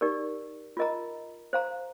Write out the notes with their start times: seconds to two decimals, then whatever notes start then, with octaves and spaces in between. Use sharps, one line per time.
0.01 D#4 G4 A#4 D5
0.77 F4 A#4 D#5 A#5
1.53 C5 F5 A#5